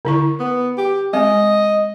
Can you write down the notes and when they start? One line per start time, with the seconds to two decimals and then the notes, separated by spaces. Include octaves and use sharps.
0.05 D3 E4 C#6
0.39 B3
0.77 G4
1.13 G#3 C4 D#5